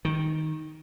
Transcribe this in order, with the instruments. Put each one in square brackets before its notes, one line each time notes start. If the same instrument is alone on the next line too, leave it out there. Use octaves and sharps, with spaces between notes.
[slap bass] D#3